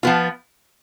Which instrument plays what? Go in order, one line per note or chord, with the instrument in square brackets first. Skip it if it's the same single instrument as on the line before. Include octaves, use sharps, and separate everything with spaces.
[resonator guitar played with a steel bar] F3 B3 F4